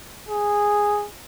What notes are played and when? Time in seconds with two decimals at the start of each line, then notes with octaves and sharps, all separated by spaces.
0.29 G#4